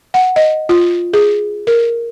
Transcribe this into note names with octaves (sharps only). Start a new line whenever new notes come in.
F#5
D#5
F4
G#4
A#4